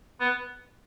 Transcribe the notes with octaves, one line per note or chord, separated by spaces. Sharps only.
B3